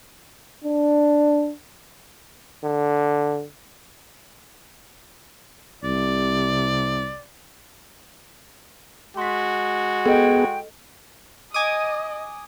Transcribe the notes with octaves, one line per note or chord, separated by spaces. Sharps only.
D4
D3
C2 C3 D5
G#3 F#4 C6 B6
B3 G#4 A4 D#5 G5
D#5 G#5 D6 D#6